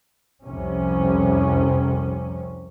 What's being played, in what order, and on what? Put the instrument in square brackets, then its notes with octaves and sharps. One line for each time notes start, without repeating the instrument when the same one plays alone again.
[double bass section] C2 F2 C3 C#4